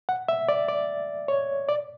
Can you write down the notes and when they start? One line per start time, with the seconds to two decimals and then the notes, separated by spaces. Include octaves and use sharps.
0.09 F#5
0.28 E5
0.49 D5
0.68 D5
1.28 C#5
1.68 D5